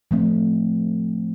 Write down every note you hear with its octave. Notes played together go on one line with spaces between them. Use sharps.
F3 A3 C4